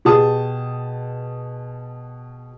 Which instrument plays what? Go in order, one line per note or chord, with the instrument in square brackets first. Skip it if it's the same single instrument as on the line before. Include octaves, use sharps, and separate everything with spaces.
[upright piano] B2 G4 G#4 A5 D#6